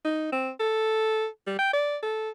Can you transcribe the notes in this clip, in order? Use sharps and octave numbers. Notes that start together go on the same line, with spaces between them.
D#4
C4
A4
G3
G5
D5
A4